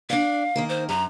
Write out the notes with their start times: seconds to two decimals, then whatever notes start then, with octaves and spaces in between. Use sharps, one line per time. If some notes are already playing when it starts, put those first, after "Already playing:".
0.10 D4 D5 F5
0.56 D#3 A#3 A#4
0.69 C5
0.89 F#2 A#5